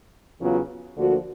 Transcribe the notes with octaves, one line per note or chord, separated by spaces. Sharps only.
E2 C#3 F#3 B3 F4
D2 D3 F3 A#3 F#4